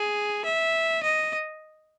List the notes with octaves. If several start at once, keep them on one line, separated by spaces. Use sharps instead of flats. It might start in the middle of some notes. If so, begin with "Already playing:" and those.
Already playing: G#4
E5
D#5